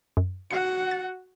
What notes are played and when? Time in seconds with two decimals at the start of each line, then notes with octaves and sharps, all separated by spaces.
0.17 F#2
0.51 F#4 F#5 C#7
0.91 A6